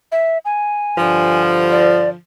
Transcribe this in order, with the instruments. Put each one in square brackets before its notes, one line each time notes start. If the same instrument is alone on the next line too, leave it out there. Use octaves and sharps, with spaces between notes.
[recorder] E5
G#5
[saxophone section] G2 D3 F3
[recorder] D5